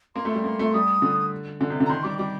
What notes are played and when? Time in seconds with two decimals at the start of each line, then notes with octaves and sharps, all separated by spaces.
0.16 A#3 C6
0.25 A3
0.30 G3 C6
0.44 A#3
0.59 A3
0.74 G3 D#6
1.02 D3
1.61 D3
1.70 C3
1.80 D3
1.85 A#5
1.89 D#3 C6
2.04 G3 D6
2.19 G3 D6